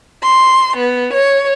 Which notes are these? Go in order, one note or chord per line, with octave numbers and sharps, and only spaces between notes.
C6
B3
C#5